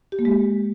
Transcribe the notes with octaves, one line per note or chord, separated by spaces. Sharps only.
G4
A#3
G#3